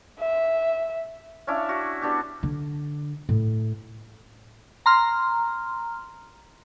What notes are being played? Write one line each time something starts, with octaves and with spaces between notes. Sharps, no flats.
E5
C#4 D4 E4 F5
F#4
B3 D4 F#4 G4
D3
A2
A#5 C6 F6